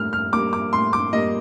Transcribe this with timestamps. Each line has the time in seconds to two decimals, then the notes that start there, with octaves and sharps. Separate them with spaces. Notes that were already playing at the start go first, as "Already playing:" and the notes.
Already playing: A2 G3 A#3 F6
0.13 F6
0.32 G3 A#3 D6
0.53 D6
0.73 A2 C6
0.93 D6
1.13 G3 A#3 D#5